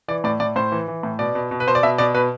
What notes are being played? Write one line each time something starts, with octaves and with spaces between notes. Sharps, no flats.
E3 D5
A2 D5
A2 D5
A2 C5
E3
E3
A2
B2 D5
B2
B2
B4
B2 C5
D5
B2 E5
B2 D5
B2 B4